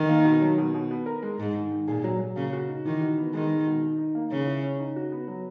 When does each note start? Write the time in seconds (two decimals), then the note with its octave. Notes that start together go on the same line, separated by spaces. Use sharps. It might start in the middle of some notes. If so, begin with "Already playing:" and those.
Already playing: D#3
0.09 A#3
0.25 B2
0.41 F#3
0.58 B2
0.74 B2
0.91 B3
1.06 A#4
1.22 G#3
1.39 G#2 G#3
1.55 D#3
1.72 D#3
1.88 A#2 G#4
2.04 F#3
2.19 F#3
2.36 C#3 A#3
2.53 F#4
2.69 D#4
2.85 D#3 E3
3.01 F#4
3.18 B3
3.34 D#3 G#3
3.50 G#3
3.67 B2
3.82 D#4
3.98 D#4
4.15 A#3
4.31 C#3 C#4
4.47 E4
4.63 C#4
4.79 D#4
4.96 F#4
5.12 B3
5.28 F#3